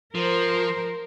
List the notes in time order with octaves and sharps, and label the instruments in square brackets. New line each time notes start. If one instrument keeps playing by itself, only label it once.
[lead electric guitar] F3 [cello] A#4 C5